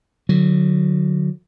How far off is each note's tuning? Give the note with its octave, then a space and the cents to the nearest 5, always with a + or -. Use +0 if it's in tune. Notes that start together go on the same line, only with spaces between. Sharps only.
D3 +15 F#3 -15